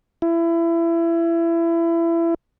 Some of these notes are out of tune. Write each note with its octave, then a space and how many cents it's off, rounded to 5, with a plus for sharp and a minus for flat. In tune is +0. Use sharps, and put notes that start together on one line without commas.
E4 +25